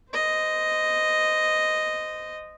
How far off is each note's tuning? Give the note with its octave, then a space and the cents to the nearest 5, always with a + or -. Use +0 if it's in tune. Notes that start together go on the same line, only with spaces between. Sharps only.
C5 -20 D#5 +0